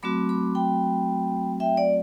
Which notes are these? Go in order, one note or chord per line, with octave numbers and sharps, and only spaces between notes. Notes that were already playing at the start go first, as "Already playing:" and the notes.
F#3 A3 C4 F#4 B5 D6
B5 D6
G5 B5
E5 G5
D5 F#5